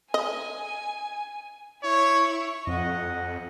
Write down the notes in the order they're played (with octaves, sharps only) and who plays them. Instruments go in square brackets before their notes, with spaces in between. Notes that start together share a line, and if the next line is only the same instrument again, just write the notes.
[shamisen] D#5 [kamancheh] G#5
[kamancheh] E4 C#6 [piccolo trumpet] C#5
[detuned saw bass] F2 [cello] D#5 F#5